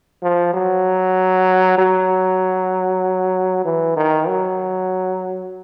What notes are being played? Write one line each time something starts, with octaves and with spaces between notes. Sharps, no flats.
F3
F#3
F#3
E3
D#3
F#3